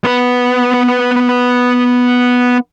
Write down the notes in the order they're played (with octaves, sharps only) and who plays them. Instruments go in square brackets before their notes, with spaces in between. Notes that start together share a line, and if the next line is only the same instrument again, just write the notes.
[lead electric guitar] B3 B4